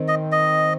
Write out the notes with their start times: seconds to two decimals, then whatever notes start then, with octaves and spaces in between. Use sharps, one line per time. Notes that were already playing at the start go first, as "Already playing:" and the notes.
Already playing: D#3 C4
0.08 D#5
0.32 D#5